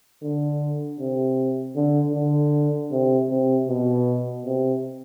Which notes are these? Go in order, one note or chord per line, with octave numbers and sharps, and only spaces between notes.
D3
C3
D3
D3
C3
C3
B2
C3